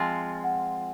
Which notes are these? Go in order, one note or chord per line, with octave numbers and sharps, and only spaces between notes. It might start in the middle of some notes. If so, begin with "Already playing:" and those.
Already playing: F3 G#3 C4 F4 G#5
F#5